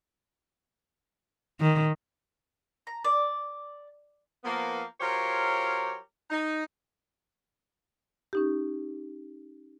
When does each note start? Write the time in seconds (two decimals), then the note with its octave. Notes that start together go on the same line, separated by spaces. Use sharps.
1.60 D#3
2.87 A#5
3.05 D5
4.44 F3 A#3 B3
5.00 F#3 F4 G4 A#4 C5 C#5
6.30 D#4
8.33 C#4 D#4 G4